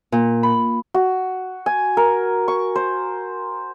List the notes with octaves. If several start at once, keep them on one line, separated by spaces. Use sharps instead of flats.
A#2
B5
F#4
G#5
A#4
C#6
C5